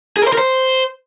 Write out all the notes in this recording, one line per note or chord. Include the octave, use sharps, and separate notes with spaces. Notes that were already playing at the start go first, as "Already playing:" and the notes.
G#4
A#4
C5
A#4
C5